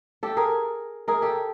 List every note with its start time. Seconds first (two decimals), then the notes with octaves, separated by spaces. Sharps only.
0.23 G4 A4
0.37 G#4 A#4
1.08 G#4 A#4
1.22 G4 A4